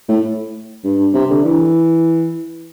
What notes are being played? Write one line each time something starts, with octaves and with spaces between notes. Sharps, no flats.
A2
G2
C3
D3
E3